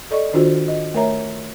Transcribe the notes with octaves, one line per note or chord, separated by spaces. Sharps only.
A4 D5 D#5 C#6
D#3 D4 F4 F#4 C5
D#5
A3 A#4 C#5 E5 A#5